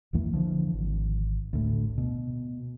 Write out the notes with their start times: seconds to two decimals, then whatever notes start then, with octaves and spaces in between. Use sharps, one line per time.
0.13 B1 F2 E3 A#3
0.33 D3 E3 F3
0.73 G#1
1.53 D2 A2
1.98 B2